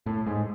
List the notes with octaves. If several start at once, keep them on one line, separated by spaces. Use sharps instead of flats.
A2
G#2